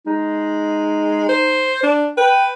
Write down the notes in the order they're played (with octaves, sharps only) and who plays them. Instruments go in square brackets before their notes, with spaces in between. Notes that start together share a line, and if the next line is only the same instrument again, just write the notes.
[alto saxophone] G#3 [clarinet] D#4
[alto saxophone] C5
D4
[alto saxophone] B4 [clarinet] G5